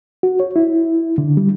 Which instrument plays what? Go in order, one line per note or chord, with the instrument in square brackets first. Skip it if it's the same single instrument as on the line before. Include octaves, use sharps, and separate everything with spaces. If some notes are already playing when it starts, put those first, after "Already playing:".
[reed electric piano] F#4
C#5
E4
D3
G3